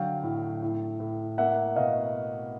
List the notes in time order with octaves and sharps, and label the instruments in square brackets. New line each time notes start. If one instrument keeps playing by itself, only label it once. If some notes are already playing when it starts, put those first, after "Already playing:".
Already playing: [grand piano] D3 F#3 F5 G5
A2
A2
A2
A#3 E5 F#5
B2 D#5 F5